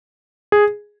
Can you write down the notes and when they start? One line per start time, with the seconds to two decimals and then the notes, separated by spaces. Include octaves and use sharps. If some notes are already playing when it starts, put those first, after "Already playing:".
0.52 G#4